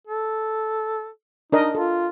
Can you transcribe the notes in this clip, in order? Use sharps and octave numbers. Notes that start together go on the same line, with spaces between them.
A4
D4 D#4 A#4 D#5
F4 A4